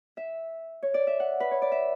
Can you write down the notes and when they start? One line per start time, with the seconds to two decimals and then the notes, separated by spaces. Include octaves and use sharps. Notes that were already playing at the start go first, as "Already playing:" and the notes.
0.17 E5
0.83 C#5
0.94 D5
1.07 E5
1.20 F#5
1.40 B4
1.51 C#5
1.62 D5
1.72 E5